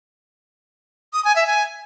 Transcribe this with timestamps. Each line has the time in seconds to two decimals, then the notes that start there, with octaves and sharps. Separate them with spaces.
1.13 D#6
1.25 G#5
1.36 E5
1.47 G#5